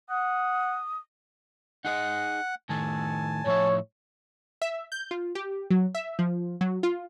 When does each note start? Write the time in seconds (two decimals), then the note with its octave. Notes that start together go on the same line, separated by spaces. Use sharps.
0.10 F#5 D#6
1.85 D#4 G#4 D#5 F#5
2.69 A2 D#3 A3 G#5 A5
3.46 A2 F3 C#5 E5
4.62 E5
4.92 G6
5.11 F4
5.35 G4
5.70 F#3
5.95 E5
6.19 F3
6.61 F#3
6.83 F4